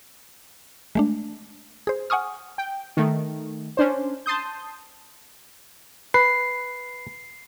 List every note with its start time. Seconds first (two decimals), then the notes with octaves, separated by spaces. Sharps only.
0.95 G#3 A3 D4
1.87 G#4 C5
2.10 F#5 G#5 C#6 D#6 F6
2.58 G5
2.97 D#3 A3
3.77 C#4 D4 C5
4.26 A5 C6 D#6 G6
6.14 B4 C7